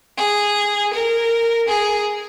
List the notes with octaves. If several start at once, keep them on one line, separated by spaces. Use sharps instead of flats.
G#4
A#4
G#4